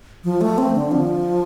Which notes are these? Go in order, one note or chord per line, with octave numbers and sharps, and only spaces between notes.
F3
A3
C4
D3
F3